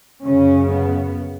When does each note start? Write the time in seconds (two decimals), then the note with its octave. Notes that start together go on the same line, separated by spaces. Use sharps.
0.25 F#2 C#3 C#4
0.71 B3